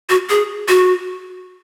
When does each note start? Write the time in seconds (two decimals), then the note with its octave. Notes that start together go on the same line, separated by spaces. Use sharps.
0.10 F#4
0.30 G#4
0.69 F#4